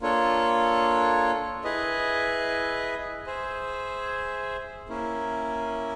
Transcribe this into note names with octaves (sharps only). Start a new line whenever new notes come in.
A#3 D4 F4 A4 C#5
E4 G#4 B4 D#5
G#4 C5 E5
A#3 C#4 E4